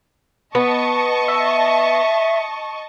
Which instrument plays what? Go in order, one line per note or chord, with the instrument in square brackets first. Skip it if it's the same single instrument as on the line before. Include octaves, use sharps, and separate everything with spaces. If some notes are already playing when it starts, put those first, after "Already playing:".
[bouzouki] B3 [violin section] D#5 A5 C#6
[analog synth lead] E5